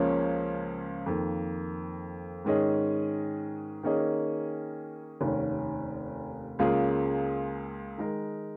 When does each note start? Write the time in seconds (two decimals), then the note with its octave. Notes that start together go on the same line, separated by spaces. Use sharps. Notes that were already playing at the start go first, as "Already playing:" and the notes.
Already playing: C#2 C#3 F3 A#3 C#4
1.06 F2 D#3 A#3
2.45 G#2 D#3 C#4 G#4 D#5
3.83 D#3 A#3 C#4 G#4 D#5
5.21 F1 D#2 D#3 C#4
6.59 C#2 C#3 A#3 F4 G#4
7.98 D#3 G#3 D#4 A#4